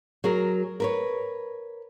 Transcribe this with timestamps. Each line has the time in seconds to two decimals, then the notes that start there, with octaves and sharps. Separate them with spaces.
0.24 F#3 G#4 A#4
0.80 A#4 B4 C#5